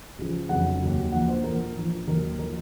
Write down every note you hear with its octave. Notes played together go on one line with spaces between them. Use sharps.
C#2 C#3 F3
F1 F2 C#3 F#3 F#5
D#2 D#3 F#3
A#1 A#2 F3 F#5
C5
A#1 A#2 F3 A#4
A#1 A#2 F3
D#2 D#3 F#3 A#4
A#4
F3